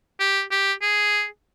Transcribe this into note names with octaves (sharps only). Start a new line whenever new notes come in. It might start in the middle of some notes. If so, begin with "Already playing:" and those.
G4
G4
G#4